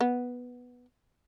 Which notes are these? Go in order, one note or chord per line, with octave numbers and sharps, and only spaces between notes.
B3